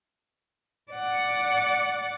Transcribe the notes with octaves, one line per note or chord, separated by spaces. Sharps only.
D5 F#5